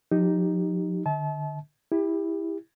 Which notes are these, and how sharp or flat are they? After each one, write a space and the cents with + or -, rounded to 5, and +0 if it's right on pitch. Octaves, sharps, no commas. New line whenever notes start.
F3 +40 D#4 +0 G4 +0
D3 +20 E5 -45 A5 -35
E4 -5 G4 +30